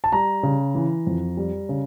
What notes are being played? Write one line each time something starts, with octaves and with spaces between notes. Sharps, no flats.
A5
G3 A#5
C#3
E3
F2
G3
C#3